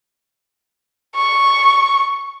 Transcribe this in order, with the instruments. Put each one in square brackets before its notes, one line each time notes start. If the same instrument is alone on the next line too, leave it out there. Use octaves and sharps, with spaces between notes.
[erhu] C#6